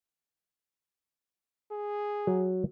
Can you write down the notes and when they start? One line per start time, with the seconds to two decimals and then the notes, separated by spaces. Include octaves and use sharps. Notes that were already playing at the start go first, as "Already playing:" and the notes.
1.71 G#4
2.27 F#3